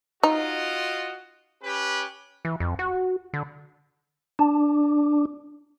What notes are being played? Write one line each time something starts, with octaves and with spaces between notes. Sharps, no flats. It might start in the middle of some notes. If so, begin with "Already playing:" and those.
D#4 F4 F#4 D#5
C#4 G4 B4
E3
F2
F#4
D3
D4